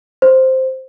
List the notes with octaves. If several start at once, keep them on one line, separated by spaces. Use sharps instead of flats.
C5